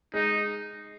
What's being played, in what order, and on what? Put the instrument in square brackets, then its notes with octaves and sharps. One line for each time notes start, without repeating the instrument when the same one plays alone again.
[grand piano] G#3 [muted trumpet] D#4